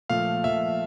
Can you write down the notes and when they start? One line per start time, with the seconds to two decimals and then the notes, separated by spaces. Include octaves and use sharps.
0.10 A#2 F3 A3 F5
0.44 A#2 F3 A3 E5